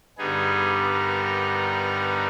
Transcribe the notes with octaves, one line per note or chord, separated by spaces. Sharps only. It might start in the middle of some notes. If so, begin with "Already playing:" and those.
G2 D3 G3 B3 D#4 G#4
A#4